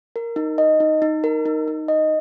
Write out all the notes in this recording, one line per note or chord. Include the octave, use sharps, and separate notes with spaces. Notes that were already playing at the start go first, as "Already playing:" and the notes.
A#4
D#4
D#5
D#4
D#4
A#4
D#4
D#4
D#5